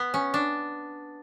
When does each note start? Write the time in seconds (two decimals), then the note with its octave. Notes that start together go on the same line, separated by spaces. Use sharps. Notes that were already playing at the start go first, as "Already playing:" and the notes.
Already playing: B3
0.14 C#4
0.34 D4